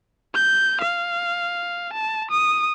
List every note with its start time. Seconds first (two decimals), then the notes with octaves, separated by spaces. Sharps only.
0.35 G6
0.81 F5
1.93 A5
2.31 D#6